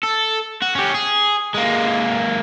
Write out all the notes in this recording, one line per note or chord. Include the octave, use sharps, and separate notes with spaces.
A4
F#4
C#4 G4
G#4
G#3 A#3